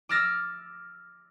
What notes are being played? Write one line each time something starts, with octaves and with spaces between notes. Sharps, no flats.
D6 E6 F6 A6 A#6